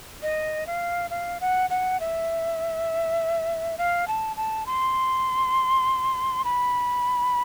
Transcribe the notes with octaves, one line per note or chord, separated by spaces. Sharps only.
D#5
F5
F5
F#5
F#5
E5
F5
A5
A5
C6
B5